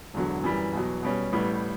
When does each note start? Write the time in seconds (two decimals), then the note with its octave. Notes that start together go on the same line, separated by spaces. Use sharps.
0.14 E1 E2 D3 F#3
0.44 F#2 E3 G3
0.73 E2 B2 F#3
1.03 B2 G3 C#4
1.32 A1 A2 G3 B3